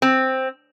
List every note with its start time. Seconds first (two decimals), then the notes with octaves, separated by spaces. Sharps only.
0.02 C4